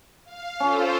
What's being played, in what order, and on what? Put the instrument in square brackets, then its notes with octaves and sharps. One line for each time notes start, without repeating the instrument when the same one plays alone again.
[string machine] F5
[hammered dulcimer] C#4 [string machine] F4 A4 C5